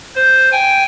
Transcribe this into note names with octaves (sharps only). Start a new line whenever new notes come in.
C5
G5 G#5